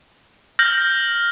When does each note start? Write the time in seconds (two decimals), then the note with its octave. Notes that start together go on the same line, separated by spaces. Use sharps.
0.59 F6 G6 A#6 F#7